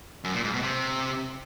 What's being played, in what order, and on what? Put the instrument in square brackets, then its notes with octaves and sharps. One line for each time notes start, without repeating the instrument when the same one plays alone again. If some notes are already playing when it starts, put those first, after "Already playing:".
[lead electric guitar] F#2
A#2
G#2
B2
C3